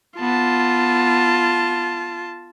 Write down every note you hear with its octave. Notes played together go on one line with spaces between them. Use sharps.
B3 F4 A5